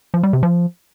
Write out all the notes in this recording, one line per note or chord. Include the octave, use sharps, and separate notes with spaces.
F3
G3
C3
F3